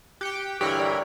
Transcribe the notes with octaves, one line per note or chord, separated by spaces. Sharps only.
G4 G5 F#6 C#7
G2 D3 E3 G4 A#4 C#5 B5 C#6
D5